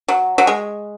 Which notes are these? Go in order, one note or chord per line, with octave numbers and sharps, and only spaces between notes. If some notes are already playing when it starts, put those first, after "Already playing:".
F#3
F#3
G#3